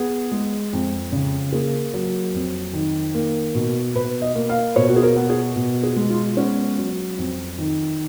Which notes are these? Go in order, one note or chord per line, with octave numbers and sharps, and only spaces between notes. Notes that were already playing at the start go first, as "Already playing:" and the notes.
Already playing: B3 G#4
G#3
F2
C#3
A#3 G#4
F#3
F2
D#3
A#3
B2
B2 B4
D#5
A#3
F5
B2 C#5
F#4
G#4
A#4
B3
G#4
B2
G#4
G#3
F4
B3 C#4
F#3
F2
D#3